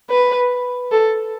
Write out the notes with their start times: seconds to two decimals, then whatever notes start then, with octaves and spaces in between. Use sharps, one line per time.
0.10 B4
0.92 A4